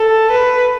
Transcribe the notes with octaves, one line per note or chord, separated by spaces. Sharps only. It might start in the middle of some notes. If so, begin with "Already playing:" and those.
Already playing: A4
B4